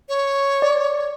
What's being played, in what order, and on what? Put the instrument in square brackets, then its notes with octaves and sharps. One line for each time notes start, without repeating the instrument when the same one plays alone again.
[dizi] C#5
[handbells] D5